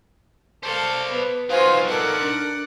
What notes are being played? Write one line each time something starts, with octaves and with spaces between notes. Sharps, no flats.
A4 C5 D5 F5 A5
B3 B4
D#4 F4 F#4 C5 F5 G#5 C6
A4 A#4 D5 F#5
D4 A#4